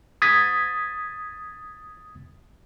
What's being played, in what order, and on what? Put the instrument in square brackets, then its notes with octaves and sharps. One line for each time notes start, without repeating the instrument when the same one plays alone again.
[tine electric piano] D#6 G#6 A6 B6